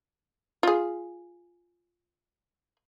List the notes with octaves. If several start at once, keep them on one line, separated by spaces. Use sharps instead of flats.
F4 G#4